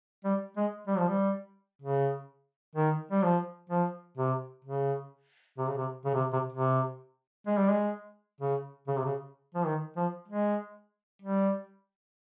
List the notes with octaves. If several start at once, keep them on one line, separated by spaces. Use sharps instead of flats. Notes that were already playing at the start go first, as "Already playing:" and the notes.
G3
G#3
G3
F3
G3
C#3
D#3
G3
F3
F3
C3
C#3
C3
C#3
C3
C#3
C3
C3
C3
G#3
G3
G#3
C#3
C#3
C3
C#3
F3
D#3
F3
G#3
G3